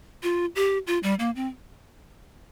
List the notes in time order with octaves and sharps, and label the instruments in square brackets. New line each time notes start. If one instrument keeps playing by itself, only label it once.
[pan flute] F4
G4
F4
G3
A#3
C4